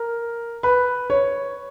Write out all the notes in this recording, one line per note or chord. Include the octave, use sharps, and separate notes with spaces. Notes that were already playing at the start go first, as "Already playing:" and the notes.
Already playing: A#4
B4
C#5